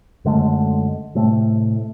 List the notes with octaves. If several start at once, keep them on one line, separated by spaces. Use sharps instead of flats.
F#2 D3 G#3 A3
A2 C3 A3